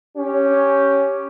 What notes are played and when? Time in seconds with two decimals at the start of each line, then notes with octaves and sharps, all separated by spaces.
0.17 C#4 G4